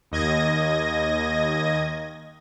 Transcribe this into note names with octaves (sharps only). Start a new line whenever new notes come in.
D#2 D#5 G#6 A#6